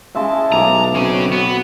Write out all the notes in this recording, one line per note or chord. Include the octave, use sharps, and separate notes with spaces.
C#3 G#3 E4 A5 C6
B1 D#5 G#5 A#5 D6
C#3 C4 C#4 F#4
B3